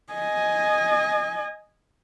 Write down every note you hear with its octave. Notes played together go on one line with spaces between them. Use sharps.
D#5 G#5